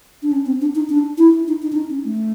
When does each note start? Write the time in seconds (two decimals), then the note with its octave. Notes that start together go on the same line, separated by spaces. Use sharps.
0.23 D4
0.32 C#4
0.46 C4
0.61 D4
0.75 D#4
0.90 D4
1.18 E4
1.48 D#4
1.62 D#4
1.72 D4
1.76 D#4
1.90 C#4
2.04 A3